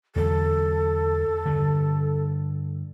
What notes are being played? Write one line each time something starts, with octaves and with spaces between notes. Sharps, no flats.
E2 D3 F#3 A4
G2 D3